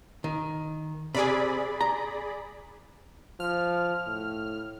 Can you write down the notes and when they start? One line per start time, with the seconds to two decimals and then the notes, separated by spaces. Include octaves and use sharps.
0.24 D#3
1.15 C3 G#4 D5 B5
1.81 A#5
3.40 F3 F6
4.06 A2